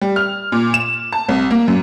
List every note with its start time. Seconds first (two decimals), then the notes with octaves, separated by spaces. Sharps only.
0.01 G3
0.16 F6
0.52 A#2
0.74 E7
1.12 A5
1.29 C2
1.51 A#3
1.68 F#2